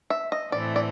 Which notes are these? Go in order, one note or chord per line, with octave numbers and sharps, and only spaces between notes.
E5
D#5
A2 E3 A3 C4 D5
D5